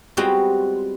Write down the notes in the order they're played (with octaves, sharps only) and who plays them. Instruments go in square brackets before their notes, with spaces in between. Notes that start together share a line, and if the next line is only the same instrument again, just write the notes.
[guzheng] G3 G#3 B3 C4 F4 F#4